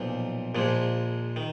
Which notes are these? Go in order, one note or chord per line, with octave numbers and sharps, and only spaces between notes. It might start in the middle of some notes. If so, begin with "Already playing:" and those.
Already playing: B1 A#2 F3
A#1 A#2 F3 G#3
D#3